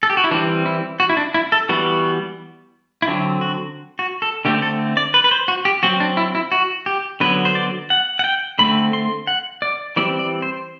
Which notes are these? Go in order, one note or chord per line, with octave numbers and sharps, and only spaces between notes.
A4
G4
F#4
E4
E3 G3 C4 D4
E4
F#4
E4
D4
E4
A4
E3 G3 B3 F#4
E4
D3 F#3 C4 D4
F#4
F#4
A4
D3 A3 C4 G4
A4
D5
B4
B4
C5
F#4
G4
F#3 C4 F#4
D4
E4
E4
F#4
G4
D3 F#3 B3 B4
C5
D5
F#5
F#5
G5
D3 A3 C4 B5
C6
F#5
D5
E3 G3 C4 D5
D5
C5